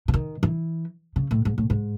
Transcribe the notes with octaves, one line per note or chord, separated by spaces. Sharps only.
C#3
D#3
E3
C#3
A2
G#2
A2
G#2